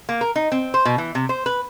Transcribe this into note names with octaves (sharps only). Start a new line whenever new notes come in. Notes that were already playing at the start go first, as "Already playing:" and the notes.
A#3
A#4
D#4
C4
C5
B2
E3
C3
C5
B4